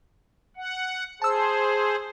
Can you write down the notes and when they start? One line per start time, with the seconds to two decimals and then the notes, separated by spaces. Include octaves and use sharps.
0.56 F#5
1.22 G#4 C5 A5 E6